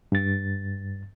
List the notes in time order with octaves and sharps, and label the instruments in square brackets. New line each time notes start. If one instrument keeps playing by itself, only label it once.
[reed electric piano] G2 A6